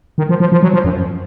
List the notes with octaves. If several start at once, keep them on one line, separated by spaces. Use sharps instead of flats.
D#3
F3
F3
F3
F#3
F3
F#2